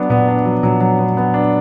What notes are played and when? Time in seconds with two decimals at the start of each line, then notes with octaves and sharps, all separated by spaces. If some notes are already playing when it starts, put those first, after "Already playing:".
Already playing: F#3 B3 D4
0.10 A#2 B3
0.28 D4
0.45 F#3
0.63 A#2 F#3
0.80 F#3
0.99 B3
1.17 B3
1.34 D4